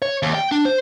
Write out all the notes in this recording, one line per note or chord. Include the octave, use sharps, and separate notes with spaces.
C#5
D#2
G5
D4
C5